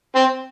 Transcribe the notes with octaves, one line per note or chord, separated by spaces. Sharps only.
C4